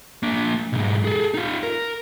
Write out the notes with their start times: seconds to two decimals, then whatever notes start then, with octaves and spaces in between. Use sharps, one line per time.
0.23 A#3 D4
0.73 B1 G#2
1.05 G#4 A4
1.34 D#4 F4
1.63 A#4